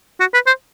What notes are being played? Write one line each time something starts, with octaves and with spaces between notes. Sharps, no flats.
F#4
B4
C5